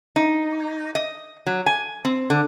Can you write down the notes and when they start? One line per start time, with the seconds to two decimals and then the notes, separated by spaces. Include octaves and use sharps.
0.16 D#4
0.95 D#5
1.47 F#3
1.66 G#5
2.05 C4
2.30 D3